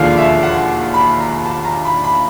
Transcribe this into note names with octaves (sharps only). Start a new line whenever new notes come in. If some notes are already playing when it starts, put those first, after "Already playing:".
Already playing: E1 D#2 D3 F3 F5
E5
F#5
B5
A#5
A5
A#5
B5
B5